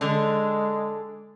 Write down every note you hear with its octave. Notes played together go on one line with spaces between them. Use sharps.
D3 G#3 D4